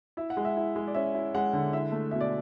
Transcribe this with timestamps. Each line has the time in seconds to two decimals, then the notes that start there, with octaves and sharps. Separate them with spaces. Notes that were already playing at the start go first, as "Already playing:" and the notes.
0.17 E4 E5
0.30 F#5
0.37 G#3
0.45 E5
0.57 E4
0.76 G#3
0.87 D5
0.94 C#4 E5
1.15 E4
1.35 G#3 F#5
1.53 D3
1.73 E4 E5
1.92 A3
2.11 B2 E5
2.21 D5